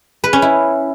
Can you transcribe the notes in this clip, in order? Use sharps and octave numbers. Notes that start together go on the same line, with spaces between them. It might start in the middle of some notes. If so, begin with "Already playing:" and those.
B4
C#4
E4